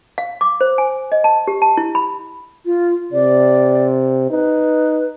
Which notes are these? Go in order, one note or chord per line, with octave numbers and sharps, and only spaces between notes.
F5
D6
C5
G#5
D#5
A5
G4
A5
E4
B5
F4
C3 D5
D#4 B4